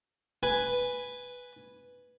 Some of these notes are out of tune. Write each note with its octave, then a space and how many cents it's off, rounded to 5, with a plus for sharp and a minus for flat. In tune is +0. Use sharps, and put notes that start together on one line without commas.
B4 +0 G#5 +0